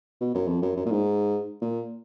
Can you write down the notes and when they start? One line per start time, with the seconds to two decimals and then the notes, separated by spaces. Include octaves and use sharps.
0.21 B2
0.35 F#2
0.48 F2
0.62 F#2
0.77 F#2
0.86 A#2
0.91 G#2
1.62 A#2